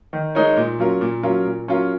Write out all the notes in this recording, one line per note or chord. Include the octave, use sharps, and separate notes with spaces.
D#3
G#3 D#4 A#4 C#5
A#2
F#3 C#4 F4 A#4
A#2
F#3 C#4 F4 A#4
A#2
F#3 C#4 F4 A#4